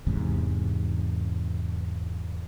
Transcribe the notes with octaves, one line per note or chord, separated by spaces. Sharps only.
E2 G#2 C3